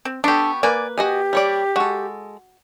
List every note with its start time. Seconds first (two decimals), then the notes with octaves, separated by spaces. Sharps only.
0.05 C4
0.24 B3 D4 G4 A4 C#6
0.63 A#3 B4 D5 G#5
0.98 F#4 G4 D#5 G#5
1.33 G3 C#5 D5
1.76 G#3 F#4 A4